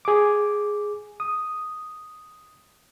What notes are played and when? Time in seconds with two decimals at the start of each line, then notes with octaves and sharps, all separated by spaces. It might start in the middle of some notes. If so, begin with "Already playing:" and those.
0.05 G#4 D6
1.20 D#6